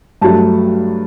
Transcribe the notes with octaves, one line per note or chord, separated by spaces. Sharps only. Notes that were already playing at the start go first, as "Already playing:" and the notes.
G2 F#3 A3 A5